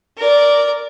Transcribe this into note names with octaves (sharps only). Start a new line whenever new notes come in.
A#4 D5